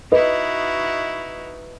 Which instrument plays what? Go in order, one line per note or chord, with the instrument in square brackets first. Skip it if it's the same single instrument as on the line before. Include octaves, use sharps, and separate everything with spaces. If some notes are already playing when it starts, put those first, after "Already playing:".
[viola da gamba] D#4 E4 F#4 [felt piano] B4 D#5